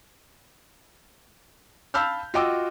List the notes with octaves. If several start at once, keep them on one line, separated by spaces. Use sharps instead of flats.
F5 A5 B5 E6 F6 G6
F4 F#4 D#5 G5 D6 E6